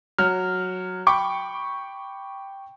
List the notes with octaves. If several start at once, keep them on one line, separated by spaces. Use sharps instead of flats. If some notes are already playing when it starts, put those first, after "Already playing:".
F#3 F6
G5 B5 C#6 D6